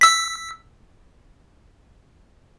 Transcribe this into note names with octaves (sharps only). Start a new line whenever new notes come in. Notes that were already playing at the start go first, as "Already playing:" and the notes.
E6 B6